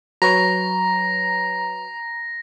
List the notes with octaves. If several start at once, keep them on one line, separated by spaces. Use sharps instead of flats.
F#3 B4 C#5 A#5 A#6